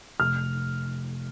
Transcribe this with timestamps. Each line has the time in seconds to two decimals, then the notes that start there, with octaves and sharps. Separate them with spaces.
0.20 F1 F6